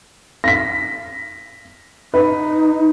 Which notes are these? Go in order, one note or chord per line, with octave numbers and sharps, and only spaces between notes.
A#6 B6
D#4 B4